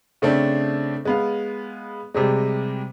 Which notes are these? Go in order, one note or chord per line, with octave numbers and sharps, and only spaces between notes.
C#3 A3 C4 D4
G#3 B3 F5
C3 G3 G#3